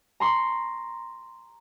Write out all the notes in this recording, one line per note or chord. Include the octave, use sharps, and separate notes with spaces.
A#5 C6 C#6